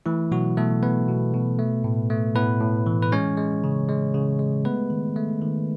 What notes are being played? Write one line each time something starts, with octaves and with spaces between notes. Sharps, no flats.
E3 A3 E4
B2 F#3 F#4
B2 A3 A4
A3 B3 B4
B2
B2
A3
A2
A3
A2 B3 B4
A2
E3
B4
G#3 C#4 C#5
G#3
C#3
G#3
C#3
G#3
A3 B3 B4
D#3
A3
D#3